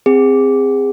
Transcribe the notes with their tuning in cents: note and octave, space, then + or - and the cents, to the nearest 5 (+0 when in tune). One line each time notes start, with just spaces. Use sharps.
C4 +0 G#4 -25